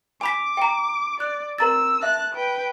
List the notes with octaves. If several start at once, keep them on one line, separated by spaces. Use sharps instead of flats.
G#5 B5 D6 B6
G5 A#5
D5 F#6
C4 A#4 A#5 E6 A6
E5 A5 F#6
B4 G5